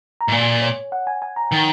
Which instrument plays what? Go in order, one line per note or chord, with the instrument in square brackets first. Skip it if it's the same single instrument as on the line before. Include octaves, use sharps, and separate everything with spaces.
[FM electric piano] A#5
[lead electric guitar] G#2
[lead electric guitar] A#2 [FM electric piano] G#5
[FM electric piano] C#5
F#5
G#5
G#5
A#5
[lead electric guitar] D#3